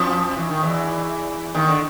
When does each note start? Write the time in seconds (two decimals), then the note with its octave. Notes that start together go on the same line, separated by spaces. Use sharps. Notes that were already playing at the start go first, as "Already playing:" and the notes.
Already playing: F2 F3
0.36 E3
0.50 D#3
0.63 E2 E3
1.54 D#2 D#3
1.69 D3